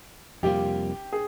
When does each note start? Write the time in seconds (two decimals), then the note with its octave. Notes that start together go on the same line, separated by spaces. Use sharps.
0.43 F2 C3 G3 A#3 F4 G4
1.13 G#4